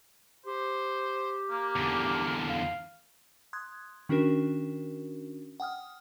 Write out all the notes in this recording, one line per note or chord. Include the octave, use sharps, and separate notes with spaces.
G4 C5
A#3
E2 D3
F5
C6 D#6 F#6 G#6
D#3 C#4 D4 F#4 A#4
F#5 G5 D#6 F6